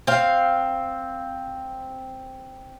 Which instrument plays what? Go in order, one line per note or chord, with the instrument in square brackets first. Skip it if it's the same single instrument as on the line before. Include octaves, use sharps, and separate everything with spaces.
[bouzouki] C4 F5